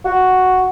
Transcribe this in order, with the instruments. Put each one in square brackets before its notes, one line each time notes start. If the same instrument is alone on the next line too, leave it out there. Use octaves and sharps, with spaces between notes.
[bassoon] F#4